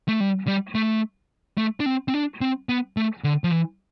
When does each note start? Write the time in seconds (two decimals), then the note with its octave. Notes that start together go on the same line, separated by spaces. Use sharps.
0.08 A3
0.20 G3
0.47 G3
0.75 A3
1.58 A3
1.80 D4
1.86 C4
2.08 C4
2.14 D4
2.41 C4
2.69 B3
2.97 A3
3.24 D3
3.44 F3
3.51 E3